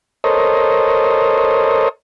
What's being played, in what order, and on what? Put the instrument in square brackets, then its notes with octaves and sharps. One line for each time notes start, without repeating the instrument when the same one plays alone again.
[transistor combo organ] A4 A#4 C5 C#5 D#5